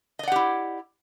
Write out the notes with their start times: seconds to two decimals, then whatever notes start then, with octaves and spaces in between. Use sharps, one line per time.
0.19 D#5
0.23 D5
0.27 F#5
0.32 G4
0.36 E4